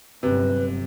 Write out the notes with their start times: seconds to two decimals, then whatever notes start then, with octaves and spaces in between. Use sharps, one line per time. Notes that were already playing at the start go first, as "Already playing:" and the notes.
0.23 G1 F#2 C3 B4